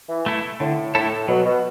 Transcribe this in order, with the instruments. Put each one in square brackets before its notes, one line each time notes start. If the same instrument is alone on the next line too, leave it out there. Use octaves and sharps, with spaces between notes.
[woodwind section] E3
[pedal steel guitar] A3 E4 A4
[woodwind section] A2 [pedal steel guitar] D3
[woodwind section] A2 [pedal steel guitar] A3 E4 A4
[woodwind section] B2 [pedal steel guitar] F#3
[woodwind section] B2